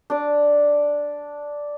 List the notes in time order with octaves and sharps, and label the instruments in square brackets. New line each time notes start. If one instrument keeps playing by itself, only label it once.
[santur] D4 D5